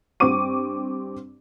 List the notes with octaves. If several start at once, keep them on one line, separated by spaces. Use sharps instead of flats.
G2 C4 C#6 D6 D#7